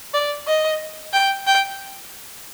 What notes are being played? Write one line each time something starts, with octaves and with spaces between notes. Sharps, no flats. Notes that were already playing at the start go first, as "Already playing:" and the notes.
D5
D#5
G5
G5